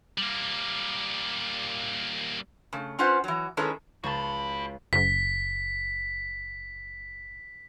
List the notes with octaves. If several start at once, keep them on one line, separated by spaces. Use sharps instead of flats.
G3 A#3
C#3 A3
C#4 F4 B4 C5 F#5
E3 F#3
D#3 G#3 C#4 E4 A4 B4
C#2 F#4 A5 B5
F#1 B6